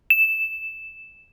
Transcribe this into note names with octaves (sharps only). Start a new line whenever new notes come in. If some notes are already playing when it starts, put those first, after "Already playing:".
E7